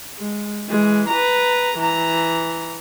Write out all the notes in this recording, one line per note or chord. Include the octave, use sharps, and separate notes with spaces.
G#3
E3 G#3
B4 A#5
E3 A#5